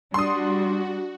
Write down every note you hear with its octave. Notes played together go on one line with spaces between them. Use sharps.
G3 D4 F#4 C6 D#6